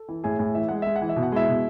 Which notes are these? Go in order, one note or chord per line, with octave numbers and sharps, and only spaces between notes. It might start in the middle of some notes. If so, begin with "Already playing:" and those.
Already playing: A4
E3
A2 G#4 G#5
A2 G#4 G#5
E3 E5
G#3 F#5
G#3 E5
F#5
E3
E5
B2
F#5
G#3 E4 E5
B2